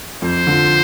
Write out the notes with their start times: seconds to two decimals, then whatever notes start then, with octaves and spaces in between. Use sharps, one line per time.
0.22 F2 C5
0.47 D3 F3